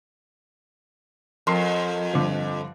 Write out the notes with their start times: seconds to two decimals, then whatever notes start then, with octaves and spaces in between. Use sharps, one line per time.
1.47 F2 A#4 C6 C7
2.13 G2 D3 F3